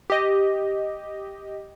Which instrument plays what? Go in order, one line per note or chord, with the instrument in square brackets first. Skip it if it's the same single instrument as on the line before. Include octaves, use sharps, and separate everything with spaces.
[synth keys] G4 D#5